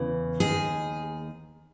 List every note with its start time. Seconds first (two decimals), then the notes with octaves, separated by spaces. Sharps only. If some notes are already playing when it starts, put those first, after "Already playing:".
Already playing: E2 C#3 E3
0.40 D#2 D#3 G#4